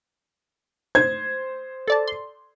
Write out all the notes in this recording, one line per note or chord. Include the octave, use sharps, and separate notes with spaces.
C5 G#6
A4 D5 A5
C6